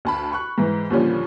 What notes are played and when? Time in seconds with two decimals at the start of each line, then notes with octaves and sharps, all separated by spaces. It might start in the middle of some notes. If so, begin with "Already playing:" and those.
0.05 D2 A5 B5
0.31 B5 C#6 F#6
0.58 G#2 E3
0.90 D#2 A#2 D3 F3 G3 C#4